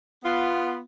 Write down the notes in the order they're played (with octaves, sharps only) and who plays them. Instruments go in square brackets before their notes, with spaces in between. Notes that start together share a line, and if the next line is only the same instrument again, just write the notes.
[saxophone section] B3 F4